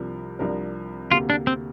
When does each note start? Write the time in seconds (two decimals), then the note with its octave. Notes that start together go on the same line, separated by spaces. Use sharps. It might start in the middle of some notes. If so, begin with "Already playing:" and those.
Already playing: C2 C3 F3 D4 A#4
0.39 C2 C3 F3 D4 A#4
1.11 D2 C3 A#3 F4 G4
1.30 D4
1.47 C4